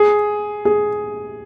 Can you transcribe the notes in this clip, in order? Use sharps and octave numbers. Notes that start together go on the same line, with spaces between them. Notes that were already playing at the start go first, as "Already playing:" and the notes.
Already playing: G#4
G#4